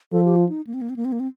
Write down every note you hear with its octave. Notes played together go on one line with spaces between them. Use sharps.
F3 A4
G4
F4
D#4
A#3
C4
A#3
C4
A#3
C4
A#3
C4